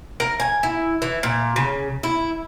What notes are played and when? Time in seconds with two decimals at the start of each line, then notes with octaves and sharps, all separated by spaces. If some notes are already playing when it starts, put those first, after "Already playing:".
0.20 A#4
0.40 G#5
0.63 E4
1.02 E3
1.23 A#2
1.56 C#3
2.03 E4